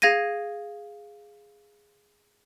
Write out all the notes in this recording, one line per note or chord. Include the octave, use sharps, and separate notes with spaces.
G#4 F5 G#6 A#6 D#7